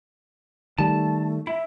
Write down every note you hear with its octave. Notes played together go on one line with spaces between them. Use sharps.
D#3 G3 A3 A5
E4 E5